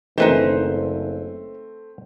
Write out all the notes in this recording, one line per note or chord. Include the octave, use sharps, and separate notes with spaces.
F#1 D#3 E3 A3 C4 D#4 B4 C5